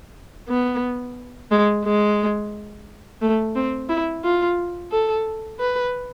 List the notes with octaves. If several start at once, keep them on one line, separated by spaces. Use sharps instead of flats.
B3
G#3
G#3
A3
C4
E4
F4
A4
B4